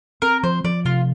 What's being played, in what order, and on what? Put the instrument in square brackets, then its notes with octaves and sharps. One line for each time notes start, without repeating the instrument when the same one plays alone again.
[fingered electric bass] C4 [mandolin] A#4
[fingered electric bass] F3 [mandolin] C5
[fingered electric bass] F3 [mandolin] D5
[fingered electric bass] C3 [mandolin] F4